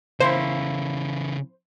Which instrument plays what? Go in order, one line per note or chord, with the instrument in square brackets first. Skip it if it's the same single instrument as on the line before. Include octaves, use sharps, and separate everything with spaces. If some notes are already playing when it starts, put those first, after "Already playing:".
[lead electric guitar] C#3 E3 [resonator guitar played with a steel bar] A#3 C#4 E4 [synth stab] C5